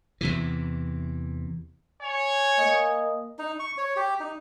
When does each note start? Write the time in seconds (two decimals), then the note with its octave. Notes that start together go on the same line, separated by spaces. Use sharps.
0.21 E2 C3 E3
2.02 C#5 G#5
2.59 A#3 D#5
3.39 D#4
3.59 C#6
3.78 C#5
3.96 G4
4.20 D#4